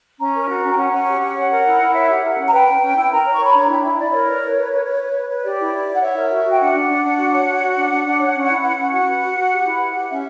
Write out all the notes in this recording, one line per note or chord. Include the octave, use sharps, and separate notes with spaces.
C#4 A#5
A#4
F#4
C#4
G5
C#4 F#5
C#4
G4
C#4
C#5 F#5
A#4
E4
E4
C#5 E5
G4 F#5
A#4 F#5
C#4 F#5
A#5
B4 G5
C#4
C#4
E4 G5
A#4 A#5
C#5
C#6
C#5 B5
D4 A#5
E4 G5
E4 E5
E5
E4 D5
A#4 C#5
B4
B4
B4
B4
B4
B4
B4
B4
G4 D5
E4
E4
E4
F#5
C#5 E5
A#4
F#4
F#4
G5
D4 F#5
D4
D4
D4
F#4
C#5
F#4
F#4
D4
D4
D4
C#5
C#4
E4
B4
C#4
F#4 F#5
B4
F#4
F#4
G4
E4
B4
G4
C#4 E5